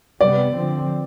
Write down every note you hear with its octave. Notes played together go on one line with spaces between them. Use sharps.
C3 G3 B3 D5
D3 F3 C4